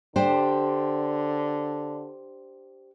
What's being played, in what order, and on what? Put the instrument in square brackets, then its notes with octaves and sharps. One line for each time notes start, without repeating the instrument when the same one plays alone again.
[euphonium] D3 [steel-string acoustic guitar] D4 G4 C5